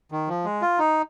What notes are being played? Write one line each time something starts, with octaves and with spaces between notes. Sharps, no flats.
D#3
F3
G#3
F4
D#4